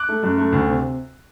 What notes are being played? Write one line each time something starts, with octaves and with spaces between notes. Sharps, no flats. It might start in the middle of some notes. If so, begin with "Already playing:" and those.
Already playing: D6 F#6
A3
F#2
A3
D2
C3